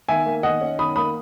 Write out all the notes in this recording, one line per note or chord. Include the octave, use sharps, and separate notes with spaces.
D#3 E5 G#5
A#3
D#3 D#5 F#5
C#4
D#3 B5 D#6
A#3 B5 D#6